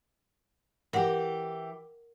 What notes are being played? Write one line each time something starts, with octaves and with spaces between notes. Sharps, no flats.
E3 G4 A#4 F#5